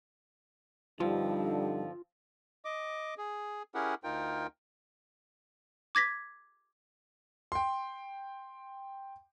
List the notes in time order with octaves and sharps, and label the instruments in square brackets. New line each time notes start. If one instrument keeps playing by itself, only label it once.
[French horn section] G2 D3 D#4 [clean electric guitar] F3 C4 [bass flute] G3 [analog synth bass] F4
[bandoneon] D#5 D6
G#4
C#4 E4 G4 G#4 A#4 F#5
D2 D#4 F4 A#4 G5
[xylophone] D6 G#6 A#6 B6
[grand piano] G5 C6